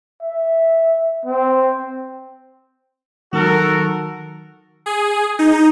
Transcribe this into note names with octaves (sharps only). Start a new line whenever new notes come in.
E5
C4
D#3 F#3 F#4 A4 A#4
G#4
D#4